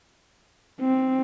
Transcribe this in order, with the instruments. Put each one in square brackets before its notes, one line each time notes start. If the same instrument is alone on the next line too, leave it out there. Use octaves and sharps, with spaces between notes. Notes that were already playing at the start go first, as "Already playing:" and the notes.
[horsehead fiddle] C4